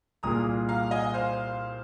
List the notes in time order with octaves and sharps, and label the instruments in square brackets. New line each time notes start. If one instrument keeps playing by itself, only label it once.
[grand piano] C2 A#2 A#3 F4 G#4 [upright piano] A#5 D#6
[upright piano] F5 A#5
D#5 G#5
C5 F5